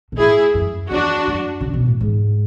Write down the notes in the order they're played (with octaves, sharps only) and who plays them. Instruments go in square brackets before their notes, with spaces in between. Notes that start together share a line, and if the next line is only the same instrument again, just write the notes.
[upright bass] B2
[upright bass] A2 [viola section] E4 G#4
[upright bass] F#2
[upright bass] E2 [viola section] D4 F#4
[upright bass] F#2
C#3
B2
A2
G#2